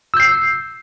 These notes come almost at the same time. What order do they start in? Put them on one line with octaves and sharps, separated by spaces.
E6 G6 C7